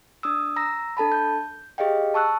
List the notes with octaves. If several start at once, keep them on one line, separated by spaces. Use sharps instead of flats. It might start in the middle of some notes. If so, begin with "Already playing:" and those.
D4 D#6 E6
A#5 E6 A#6
D4 A4 A5 B5
G6
G4 G#4 D#5 F5 G5
A5 C#6 E6 F#6